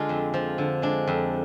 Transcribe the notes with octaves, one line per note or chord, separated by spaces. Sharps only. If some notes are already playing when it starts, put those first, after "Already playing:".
Already playing: D3 G#3 D4 F4
F2
F3
D3
G#3 D4
F2